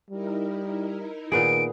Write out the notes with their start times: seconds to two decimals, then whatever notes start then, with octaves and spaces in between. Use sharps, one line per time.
0.10 G3 D#4 E4 A#4
1.32 A#2 D#3 B3 G#4 D7